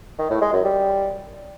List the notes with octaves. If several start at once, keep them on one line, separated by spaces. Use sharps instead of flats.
D#3
A2
G#3
F#2
G3